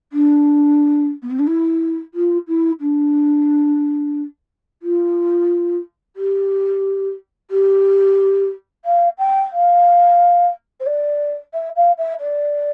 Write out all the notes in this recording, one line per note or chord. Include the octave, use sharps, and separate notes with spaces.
D4
B3
C4
D4
E4
F4
E4
D4
F4
G4
G4
F5
G5
F5
C5
D5
E5
F5
E5
D5